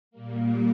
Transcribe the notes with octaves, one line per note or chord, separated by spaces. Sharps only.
A#2 G3 A#3